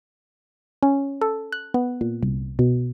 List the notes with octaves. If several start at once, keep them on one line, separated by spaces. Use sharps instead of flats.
C#4
A4
F#6
B3
A#2
C2
B2